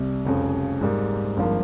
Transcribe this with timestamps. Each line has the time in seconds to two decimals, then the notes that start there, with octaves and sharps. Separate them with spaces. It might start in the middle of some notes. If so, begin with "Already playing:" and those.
Already playing: C2 C3 G3
0.25 F1 F2 C#3 F3
0.81 G#2 G3 A#3
1.37 G#1 G2 F3 A#3